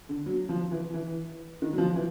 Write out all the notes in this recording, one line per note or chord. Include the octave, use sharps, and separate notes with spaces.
D3
F#3
F3
E3
E3
D#3
F#3
F3
E3